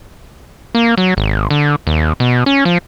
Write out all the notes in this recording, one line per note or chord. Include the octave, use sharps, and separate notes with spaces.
A#3
F#3
G#1
D3
D#2
B2
C#4
F3